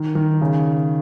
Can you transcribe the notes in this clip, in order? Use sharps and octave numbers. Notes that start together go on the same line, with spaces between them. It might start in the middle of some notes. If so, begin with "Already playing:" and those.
Already playing: D#3
D#3
C#3